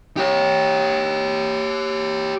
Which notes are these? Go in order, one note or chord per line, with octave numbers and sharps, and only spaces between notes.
G4 C#5